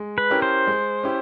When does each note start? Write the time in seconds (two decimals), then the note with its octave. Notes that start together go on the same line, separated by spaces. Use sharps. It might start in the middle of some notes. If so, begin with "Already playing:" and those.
Already playing: G#3
0.18 B4
0.30 C#4 E4 G4 A#4
0.42 C5
0.67 G#3
1.03 C#4 E4 G4